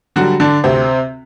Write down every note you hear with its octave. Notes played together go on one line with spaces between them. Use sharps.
D3 F#3 G3 F#4
D3 D4
D2 C3 C4